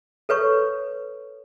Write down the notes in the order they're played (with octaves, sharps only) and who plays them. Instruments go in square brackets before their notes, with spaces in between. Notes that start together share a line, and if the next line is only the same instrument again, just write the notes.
[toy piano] A4 B4 C#5 C#6